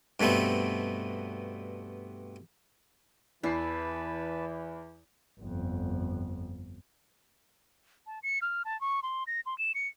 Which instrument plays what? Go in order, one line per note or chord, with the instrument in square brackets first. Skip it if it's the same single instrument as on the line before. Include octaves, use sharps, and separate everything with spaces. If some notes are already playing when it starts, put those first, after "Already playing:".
[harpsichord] G2 B2 A3 B3 C4
[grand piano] E2 C7 [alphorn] E3 [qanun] E4 [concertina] B4 A5
[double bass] G1 F2
[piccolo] A5
C#7
F6
A5
C#6
C6
A#6
C6
E7
C#7